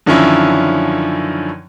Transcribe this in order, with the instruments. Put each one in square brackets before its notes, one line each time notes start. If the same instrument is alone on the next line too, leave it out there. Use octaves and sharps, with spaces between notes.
[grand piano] F#2 D3 D#3 F3 C#4 E4